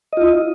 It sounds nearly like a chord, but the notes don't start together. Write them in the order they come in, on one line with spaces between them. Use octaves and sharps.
D#5 F4 E4